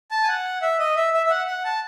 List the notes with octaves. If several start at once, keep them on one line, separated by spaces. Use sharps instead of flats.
A5
G#5
F#5
E5
D#5
E5
E5
E5
F#5
F#5
A5